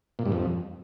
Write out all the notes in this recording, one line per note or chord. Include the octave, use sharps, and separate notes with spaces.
A#2
G2
F2